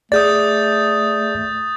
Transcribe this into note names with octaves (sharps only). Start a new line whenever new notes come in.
A3 G#4 D5 D#6 G6 A6